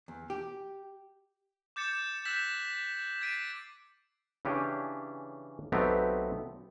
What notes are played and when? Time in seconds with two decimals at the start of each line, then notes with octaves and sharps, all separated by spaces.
0.08 E2
0.30 G4
1.76 D6 G6 A6 C#7 E7
2.25 E6 F#6 G6 B6 E7 F#7
3.21 G#6 A6 B6 C7 D7 D#7
4.45 C#3 E3 C#4 D4 G4
5.72 B1 A3 B3 C4 G4 A#5